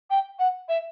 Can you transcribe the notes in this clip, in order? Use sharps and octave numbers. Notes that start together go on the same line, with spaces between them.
G5
F#5
E5